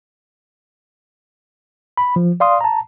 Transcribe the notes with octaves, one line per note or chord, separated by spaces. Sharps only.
B5
F3
D5 F5 C6 D#6
A5 A#5